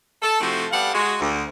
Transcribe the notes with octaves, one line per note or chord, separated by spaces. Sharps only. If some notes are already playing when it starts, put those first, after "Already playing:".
A4
C3 F3 A3 C4 E4 F#4
G3 B3 A4 F5 F#5
G#3 F#4
D2